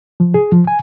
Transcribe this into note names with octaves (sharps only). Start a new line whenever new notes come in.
F3
G#4
F3
G#5